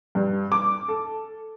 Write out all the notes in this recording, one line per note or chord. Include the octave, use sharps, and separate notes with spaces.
G2
D6
A4